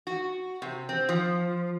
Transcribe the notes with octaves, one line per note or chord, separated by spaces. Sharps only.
F#4
C3
C4
F3